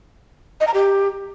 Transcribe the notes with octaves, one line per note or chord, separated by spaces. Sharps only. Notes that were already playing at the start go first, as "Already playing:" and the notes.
D#5
A#5
G4